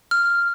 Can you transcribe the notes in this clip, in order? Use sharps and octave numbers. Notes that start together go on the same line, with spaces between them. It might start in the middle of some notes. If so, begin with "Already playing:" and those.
F6